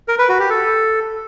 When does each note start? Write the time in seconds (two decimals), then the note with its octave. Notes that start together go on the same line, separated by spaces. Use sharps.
0.08 A#4
0.19 B4
0.29 F#4
0.39 G4
0.50 A4